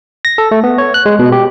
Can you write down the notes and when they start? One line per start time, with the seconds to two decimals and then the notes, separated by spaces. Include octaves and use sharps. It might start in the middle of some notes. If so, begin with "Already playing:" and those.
0.25 A#6
0.38 A4
0.51 A3
0.64 B3
0.78 C#5
0.94 F#6
1.06 G#3
1.19 B2
1.32 G4